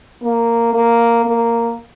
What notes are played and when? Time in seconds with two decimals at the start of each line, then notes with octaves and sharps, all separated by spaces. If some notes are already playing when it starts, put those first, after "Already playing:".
0.22 A#3
0.73 A#3
1.25 A#3